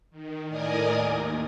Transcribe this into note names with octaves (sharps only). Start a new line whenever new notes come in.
D#3
A2 A#4 D5 D#5 G#5 D#6
D#2